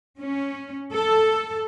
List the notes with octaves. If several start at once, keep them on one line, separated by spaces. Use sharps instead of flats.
C#4
A4